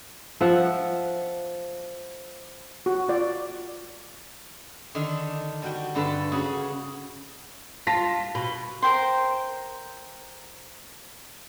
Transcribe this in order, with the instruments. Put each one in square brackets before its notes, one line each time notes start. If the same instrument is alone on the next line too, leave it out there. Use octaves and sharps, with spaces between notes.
[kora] F3 E5 F#5
[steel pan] F#4
F4 D5
[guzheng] D3 D#3 D4
G3 F#4 G5
G2 D3 A4 B4 A5
C#3 F#4 G#4
[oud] F4 [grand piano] A5 A#6 B6
[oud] B2 [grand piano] B5
[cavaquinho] A#4 C5 G5 C6